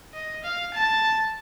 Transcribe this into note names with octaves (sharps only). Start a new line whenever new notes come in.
D#5
F5
A5